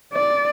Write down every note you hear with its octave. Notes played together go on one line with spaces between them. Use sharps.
D5